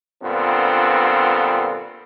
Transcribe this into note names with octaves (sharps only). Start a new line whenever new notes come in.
G2 A#2 D3 B3 C4 F4